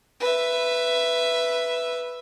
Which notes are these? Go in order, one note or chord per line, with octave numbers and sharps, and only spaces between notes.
B4 E5